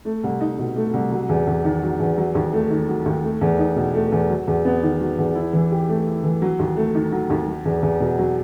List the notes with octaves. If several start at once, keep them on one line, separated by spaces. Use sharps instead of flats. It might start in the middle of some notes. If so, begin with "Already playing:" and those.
A3
C2
D#4
B2
A3
C2
F#3
E2
E2
D#3
F#3
E2
F#3
D#2
A3
D#3
F#3
D#2
A3
E2
D#4
B2
A3
E2
F#3
E2
B3
D#3
F#3
E2
E4
E3
G4
A3
E4
E3
F#3
D#2
A3
D#3
F#3
D#2
F#3
E2
E2
B2
F#3